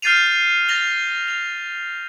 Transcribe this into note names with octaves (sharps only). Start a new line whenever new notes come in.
F6 G6 A6 C7 D#7 F7
A6 A#6 F7 G7
F7